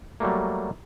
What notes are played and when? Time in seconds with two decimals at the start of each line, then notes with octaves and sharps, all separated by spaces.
0.20 F#3 G3 A3 A#3